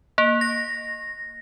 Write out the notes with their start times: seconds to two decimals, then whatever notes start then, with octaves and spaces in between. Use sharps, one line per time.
0.18 A#3
0.41 A#6